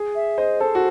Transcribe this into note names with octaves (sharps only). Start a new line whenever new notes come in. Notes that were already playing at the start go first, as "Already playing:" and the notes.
Already playing: G#4
E5
C5 D#5
A4 C5
F#4